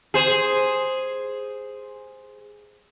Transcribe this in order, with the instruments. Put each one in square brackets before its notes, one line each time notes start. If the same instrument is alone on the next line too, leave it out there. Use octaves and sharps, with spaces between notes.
[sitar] G#4 C5